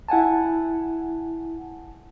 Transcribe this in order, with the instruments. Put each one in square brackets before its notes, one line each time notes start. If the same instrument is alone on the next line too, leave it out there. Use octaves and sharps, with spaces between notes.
[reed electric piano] E4 F#5 G#5 A5